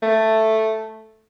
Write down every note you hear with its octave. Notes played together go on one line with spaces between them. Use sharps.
A3